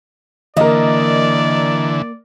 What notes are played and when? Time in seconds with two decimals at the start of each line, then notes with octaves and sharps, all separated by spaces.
0.57 D3 E3 A#3 A#4 D5 D#5